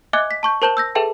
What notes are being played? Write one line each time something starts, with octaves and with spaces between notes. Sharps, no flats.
D#5 E5 G#5 D6 F#6 G#6
B6
A5 C#6 G6
A#4 C5 A5 G6 E7 F#7
E6 G6 A#6
G#4 A4 B4 E5 G5 A5